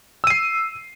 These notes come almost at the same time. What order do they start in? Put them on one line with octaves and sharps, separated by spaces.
E6 D#7 C7